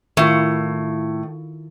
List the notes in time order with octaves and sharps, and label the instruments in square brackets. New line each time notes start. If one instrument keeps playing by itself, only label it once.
[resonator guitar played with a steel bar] A2 [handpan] D#3 E4 F4